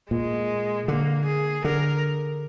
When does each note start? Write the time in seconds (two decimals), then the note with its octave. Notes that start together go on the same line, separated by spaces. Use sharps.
0.10 A#2 G#3
0.88 D3 A#3
1.26 G#4
1.65 D3 A#4